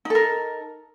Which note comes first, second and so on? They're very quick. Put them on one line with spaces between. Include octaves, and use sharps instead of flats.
D#4 A4 A#4